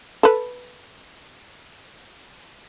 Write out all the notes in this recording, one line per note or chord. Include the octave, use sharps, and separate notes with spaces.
A4 B4